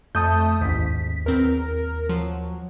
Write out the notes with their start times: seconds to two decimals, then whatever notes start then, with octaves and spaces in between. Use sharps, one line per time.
0.15 F2 A3 A5 D#6 G6
0.61 A1 D#2 G#2 B6
1.26 E2 C4 A#4
2.09 F3 F#3